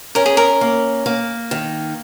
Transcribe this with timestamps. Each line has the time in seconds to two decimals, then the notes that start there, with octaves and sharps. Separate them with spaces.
0.15 C#4 A#4
0.26 G#4
0.37 A#4
0.61 A#3
1.06 A#3
1.51 D#3